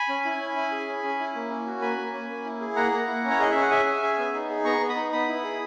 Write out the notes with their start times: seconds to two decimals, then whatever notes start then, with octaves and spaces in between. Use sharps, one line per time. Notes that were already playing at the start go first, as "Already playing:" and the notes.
Already playing: G#5 B5
0.09 C#4
0.25 E4
0.40 C#4
0.56 E4
0.71 G#4
0.88 C#4
1.03 C#4
1.19 E4
1.35 A#3
1.50 C#4
1.66 F#4
1.81 A#3 G#5 B5
1.98 A#3
2.13 C#4
2.30 A#3
2.45 E4
2.61 G#4
2.76 A#3 F#5 A#5
2.92 A#3
3.07 E4
3.24 C#4
3.30 C#5
3.39 G#4 D#5
3.52 C#4 E5
3.61 F#5
3.70 G#4 E5 G#5
3.86 C#4
4.02 G#4
4.18 B3
4.34 D#4
4.49 G#4
4.65 B3 A#5 C#6
4.80 B3
4.89 B5 D#6
4.96 D#4
5.12 B3 B5 D#6
5.28 E4
5.44 G#4